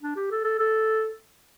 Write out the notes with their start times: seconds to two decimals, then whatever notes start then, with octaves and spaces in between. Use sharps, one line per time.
0.02 D4
0.16 G4
0.31 A4
0.44 A4
0.59 A4